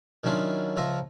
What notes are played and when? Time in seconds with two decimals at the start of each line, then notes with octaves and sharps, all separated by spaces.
0.24 D#3 F#3 C#4 D4 E4 F4
0.77 C#2 F3 F4 E5 A#5